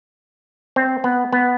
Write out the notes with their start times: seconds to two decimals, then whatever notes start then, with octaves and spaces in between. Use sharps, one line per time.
0.76 C4
1.04 B3
1.32 B3